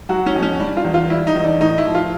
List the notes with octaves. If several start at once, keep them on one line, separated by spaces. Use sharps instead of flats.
F#3 F#4
C#4
F2
C#4
G3 D4
F4
E2
F4
G3 E4
D#4
E2
D4
A2 D#4
E4
F3
F4